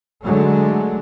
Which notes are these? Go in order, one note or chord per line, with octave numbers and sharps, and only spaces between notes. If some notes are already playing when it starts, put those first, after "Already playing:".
D3 F#3 G#3 A3